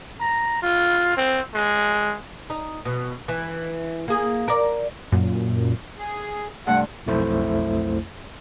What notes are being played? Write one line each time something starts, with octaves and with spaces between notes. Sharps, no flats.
A#5
F4
C4
G#3
D#4
B2
E3
A#3 G#4
A#4 D5
F#2 A#2
G#4
G2 C3 A3 F#5
B1 F2 A3 E4 C5